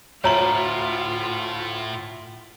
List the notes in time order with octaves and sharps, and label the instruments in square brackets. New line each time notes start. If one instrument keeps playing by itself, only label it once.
[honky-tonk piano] D2 E5 F#7 [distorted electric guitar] A2 [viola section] F4 [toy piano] C#5 A#5